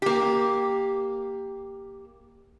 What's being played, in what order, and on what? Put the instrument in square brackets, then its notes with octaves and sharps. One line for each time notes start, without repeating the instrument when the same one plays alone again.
[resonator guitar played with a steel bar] A#3 G4